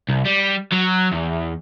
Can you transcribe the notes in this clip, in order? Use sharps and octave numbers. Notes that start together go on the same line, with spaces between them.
C2
G3
F#3
E2